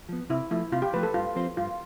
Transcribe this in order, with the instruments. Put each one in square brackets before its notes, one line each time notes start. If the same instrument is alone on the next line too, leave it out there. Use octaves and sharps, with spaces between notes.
[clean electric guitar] F3 B3
[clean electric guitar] C3 [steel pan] E4
[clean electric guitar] F3 A3 [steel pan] E4
[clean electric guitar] C3 [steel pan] F4
[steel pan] G4
[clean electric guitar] F3 A3 [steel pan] B4
[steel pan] A4
[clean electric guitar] G2 [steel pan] F4
[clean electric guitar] F3 C4 F4 C5
[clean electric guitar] G2 [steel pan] F4